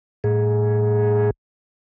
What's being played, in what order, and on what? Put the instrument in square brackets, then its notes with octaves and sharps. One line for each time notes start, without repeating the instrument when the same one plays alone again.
[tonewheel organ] A2 G#4